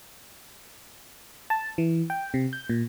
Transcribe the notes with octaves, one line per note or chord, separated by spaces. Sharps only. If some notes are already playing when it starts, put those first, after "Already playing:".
A5
E3
G5
C3
G6
A#2